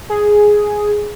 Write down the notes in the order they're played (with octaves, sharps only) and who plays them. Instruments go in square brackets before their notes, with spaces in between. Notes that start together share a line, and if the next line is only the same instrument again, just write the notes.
[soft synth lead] G#4